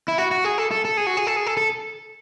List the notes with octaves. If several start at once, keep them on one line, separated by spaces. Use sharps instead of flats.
E4
F#4
F#4
G#4
A4
A4
A4
G#4
F#4
G#4
A4
G#4
A4
A4